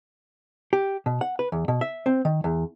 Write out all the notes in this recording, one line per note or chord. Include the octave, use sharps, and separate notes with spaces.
G4
B2
F#5
B4
E2
B2
E5
C4
D#3
E2